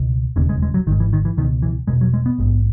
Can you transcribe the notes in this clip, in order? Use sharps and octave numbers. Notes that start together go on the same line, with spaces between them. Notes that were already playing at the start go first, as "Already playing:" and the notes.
Already playing: C#2 B2
E1 D#2 C#3 A#3
G#3
G#3
F#3
G#1 D#3
G#2
E3
D#3
E3
C#2 B2 D#3
E3
E1 E2 B2 G#3
F#3
G#3
B3
A#1 G#2